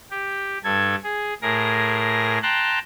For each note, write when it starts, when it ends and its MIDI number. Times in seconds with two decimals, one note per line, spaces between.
0.11 0.58 67
0.64 0.95 43
0.64 0.95 69
0.64 0.95 92
1.03 1.34 68
1.42 2.38 45
1.42 2.38 68
1.42 2.38 70
1.42 2.38 94
2.42 2.79 79
2.42 2.79 81
2.42 2.79 82
2.42 2.79 84
2.42 2.79 90